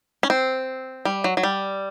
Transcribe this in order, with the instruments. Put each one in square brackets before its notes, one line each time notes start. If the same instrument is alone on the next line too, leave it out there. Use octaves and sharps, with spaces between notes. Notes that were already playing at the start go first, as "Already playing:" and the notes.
[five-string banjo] C#4
C4
G3
F#3
F#3
G3